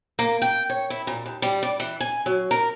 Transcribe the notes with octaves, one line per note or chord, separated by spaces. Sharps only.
A#3
G5
C#5
E4
A#2
D#2
G3
D5
E3
G#5
F#3
A#4